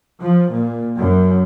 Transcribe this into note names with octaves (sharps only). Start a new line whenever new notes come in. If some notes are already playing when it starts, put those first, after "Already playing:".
F3
A#2
F#2